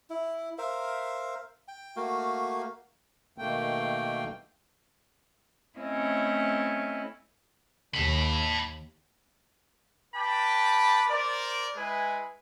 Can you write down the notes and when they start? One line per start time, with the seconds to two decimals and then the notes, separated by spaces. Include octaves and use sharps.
0.10 E4
0.58 A#4 C5 E5 F5
1.68 G5
1.96 A3 A#3 F#4 F5
3.38 B2 D#3 A3 A#3 G5
5.79 A3 C4 C#4 E4 D#5
7.95 D#2 A5 B5
10.14 B4 G5 A5 B5 D6
11.07 A#4 C5 D5
11.76 G#3 E4 B4 G#5